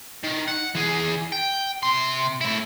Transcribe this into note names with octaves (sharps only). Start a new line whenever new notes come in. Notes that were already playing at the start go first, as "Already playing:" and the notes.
D#3
F#5
E3 G#4
G5
C3 C6
A3 E4